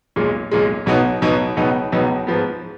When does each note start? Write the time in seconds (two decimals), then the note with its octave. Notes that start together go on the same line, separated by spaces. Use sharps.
0.16 B1 A#2 G#3
0.51 B1 A#2 G#3
0.86 B1 B2 F#3 B3 D#4
1.22 B1 B2 F#3 B3 D#4
1.56 C#2 B2 F#3 B3 D#4
1.92 C#2 B2 F#3 B3 D#4
2.27 G#2 F3 B3